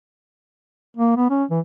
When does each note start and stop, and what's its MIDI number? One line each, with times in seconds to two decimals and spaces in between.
0.97 1.15 58
1.17 1.29 59
1.30 1.44 61
1.51 1.60 52